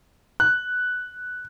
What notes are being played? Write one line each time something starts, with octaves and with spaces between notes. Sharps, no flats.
F#6